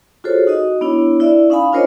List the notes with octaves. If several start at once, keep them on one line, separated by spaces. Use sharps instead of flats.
F4 F#4 G#4 A4 C5 C#5
D#4 F#4 D#5
B3 D4 E4 C#5
E4 D5 E5
C#4 D#4 F5 G#5 B5
D4 F4 A#4 C5 C#5 D#5